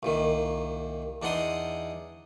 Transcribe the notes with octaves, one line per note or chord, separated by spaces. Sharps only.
C2 A#2 D#3
E2 D4 D#4 F#5 C6 D#6